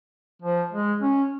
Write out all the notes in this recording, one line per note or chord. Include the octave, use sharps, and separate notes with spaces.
F3
G#3
C#4